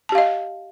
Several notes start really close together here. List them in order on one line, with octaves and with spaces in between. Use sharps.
A5 G4 F5 D#5